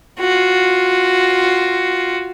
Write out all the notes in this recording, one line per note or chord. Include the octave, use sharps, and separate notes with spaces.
F4 F#4